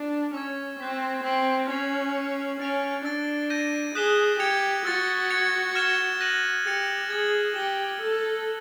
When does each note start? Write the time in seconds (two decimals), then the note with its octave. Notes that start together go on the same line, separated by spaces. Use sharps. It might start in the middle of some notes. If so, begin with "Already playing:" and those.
Already playing: D4
0.34 C#4 C#6 E6 G#6
0.80 C4 C#6 F#6 B6 E7
1.24 C4 G6 B6 D7 F#7
1.70 C#4 G#6 C7 F7
2.15 G#6 C#7 F7
2.60 C#4 A6 D7 F7
3.05 D4 E6 A6 D7
3.50 G6 A#6 D#7
3.95 G#4 D#6 F#6 B6 E7 G7
4.40 G4 G#6 C#7 F7
4.85 F#4 E6 A6 C#7
5.30 G#6 C#7 F7
5.75 F6 G#6 C#7 E7 G7
6.20 F#6 A#6 D#7 F#7
6.65 G4 A6 C#7 F7
7.10 G#4 G#6 C#7 F#7
7.55 G4 A6 C#7 E7 G7
8.00 A4 E6 A6 C#7